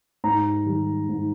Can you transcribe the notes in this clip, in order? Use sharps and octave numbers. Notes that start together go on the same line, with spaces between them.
G#2 A#5
D#3 G3
G#2